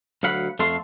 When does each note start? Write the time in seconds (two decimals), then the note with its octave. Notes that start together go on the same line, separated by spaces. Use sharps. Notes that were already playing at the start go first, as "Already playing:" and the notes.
0.23 D2 F#3 F5 F#5 B5
0.59 F2 A3 A4 F5 C6